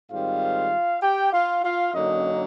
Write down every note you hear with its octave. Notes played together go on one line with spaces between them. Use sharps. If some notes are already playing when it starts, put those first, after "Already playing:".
G#2 D#3 G3 C4 F4 F5
G4 G5
F4 F5
F4 F5
F#2 D3 F#3 A#3 C#4 D#4 D#5